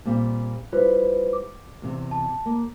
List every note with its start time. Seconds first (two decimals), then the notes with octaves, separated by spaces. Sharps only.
0.06 A#2 G3 C4
0.73 G3 E4 F4 B4 C5
1.33 D6
1.82 E2 C3
2.11 A5
2.46 A#3